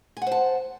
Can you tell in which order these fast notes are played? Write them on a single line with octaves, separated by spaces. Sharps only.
G#5 F#5 C5 A5